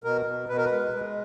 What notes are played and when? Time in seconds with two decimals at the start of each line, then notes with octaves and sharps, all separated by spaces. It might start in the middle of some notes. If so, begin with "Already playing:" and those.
0.04 B2 A#4
0.26 B2
0.49 B2 B4
0.57 A#4
0.65 B4
0.71 G#3
0.93 G#3